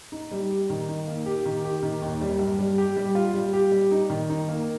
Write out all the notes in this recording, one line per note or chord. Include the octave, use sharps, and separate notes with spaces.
D#4
G3
G4
D#3
D#4
A#3
G4
D#3
G4
D#3
D#2
G3
G2
G3
G4
G3
F4
G3
G4
G3
D#4
D#3
D#4
A#3